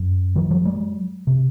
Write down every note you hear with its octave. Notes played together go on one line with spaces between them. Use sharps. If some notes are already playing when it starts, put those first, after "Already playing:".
Already playing: F#2
D#3 F3
F3 G3
F#3 G#3
C3